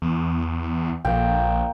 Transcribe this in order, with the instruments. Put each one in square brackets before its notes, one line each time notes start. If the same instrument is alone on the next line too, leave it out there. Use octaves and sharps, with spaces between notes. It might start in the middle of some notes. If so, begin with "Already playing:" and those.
[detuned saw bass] E2
[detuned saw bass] A#1 [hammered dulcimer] A#3 G5